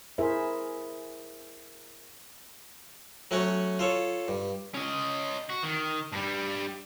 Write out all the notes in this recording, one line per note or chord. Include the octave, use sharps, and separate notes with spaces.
E4 G#4 A#4 C5 E5
F#3 A3 C#4 F#4 C#5
F4 A4 C#5
G2
C#4 D#5
F#4
D#3
G2 G3